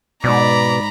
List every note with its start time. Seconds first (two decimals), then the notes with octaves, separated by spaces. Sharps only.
0.24 C2 G#2 B2 D5 A#5 B5